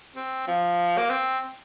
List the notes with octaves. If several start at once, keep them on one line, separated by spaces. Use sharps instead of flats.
C4
F3
A#3
C4